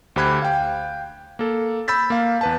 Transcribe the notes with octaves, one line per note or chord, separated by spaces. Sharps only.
D2 G4 C5 B5 F#6 G#6
F5 G5
A#3 A4
B5 E6 G6 A6 B6
A#3 F5
E2 B4 A5